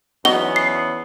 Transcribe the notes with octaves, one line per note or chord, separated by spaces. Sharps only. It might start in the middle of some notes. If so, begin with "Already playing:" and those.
E2 F#3 B3 C#4 D#4 F#4 G7
C7